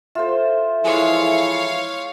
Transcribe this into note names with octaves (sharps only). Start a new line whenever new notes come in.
F4 A4 C5 E5
E3 F3 G#3 E4 C#5 F5